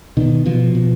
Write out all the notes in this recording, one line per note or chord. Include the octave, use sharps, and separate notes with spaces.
B2 D#3
B2 F3
B2